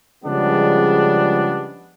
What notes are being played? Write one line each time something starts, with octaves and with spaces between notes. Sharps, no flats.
C#3 F3 G3 G#3 B3 D4